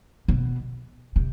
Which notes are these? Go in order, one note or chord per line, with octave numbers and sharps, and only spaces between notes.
B2
C3